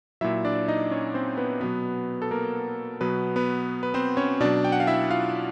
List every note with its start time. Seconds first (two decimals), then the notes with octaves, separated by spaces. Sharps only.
0.21 A#2 F#3 E4 E5
0.45 D4 D5
0.68 D#4 D#5
0.91 C#4 C#5
1.14 C4 C5
1.38 B3 B4
1.61 B2 F#3 B3 B4
2.22 A4
2.31 A#3 A#4
3.01 B2 F#3 B3 B4
3.36 B3 B4
3.83 B4
3.94 C4 C5
4.17 C#4 C#5
4.40 B2 F#3 D4 D5
4.64 G5
4.72 F#5
4.80 F5
4.87 E4 E5
5.10 F4 F5